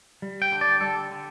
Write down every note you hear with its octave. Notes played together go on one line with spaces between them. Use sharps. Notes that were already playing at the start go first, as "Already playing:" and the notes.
G3
G5
D3
D5
G3 A4
D3